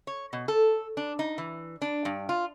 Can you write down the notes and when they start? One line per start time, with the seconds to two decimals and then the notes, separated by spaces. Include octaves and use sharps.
0.07 C#5
0.33 B2
0.48 A4
0.97 D4
1.19 D#4
1.38 E3
1.82 D4
2.05 G2
2.29 F4